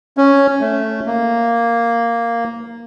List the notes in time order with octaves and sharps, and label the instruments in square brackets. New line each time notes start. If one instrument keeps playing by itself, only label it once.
[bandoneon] C#4
A3
A#3